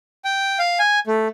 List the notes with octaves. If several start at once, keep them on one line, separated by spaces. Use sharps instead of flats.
G5
F5
G#5
A3